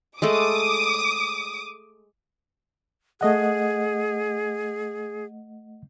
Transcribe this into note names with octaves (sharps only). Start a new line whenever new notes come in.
G#3 A3 A4 D6 D#6
A3 G#4 D#5 F#5